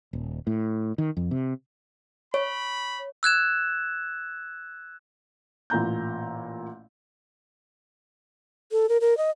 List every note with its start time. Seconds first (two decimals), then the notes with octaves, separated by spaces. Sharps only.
0.13 D#1
0.47 A2
0.98 D#3
1.17 F2
1.31 C3
2.34 C#5 B5
3.23 E6 F#6 G#6 E7
5.70 A1 A#2 A#5 G6
8.72 A4
8.89 A#4
9.01 A#4
9.18 D#5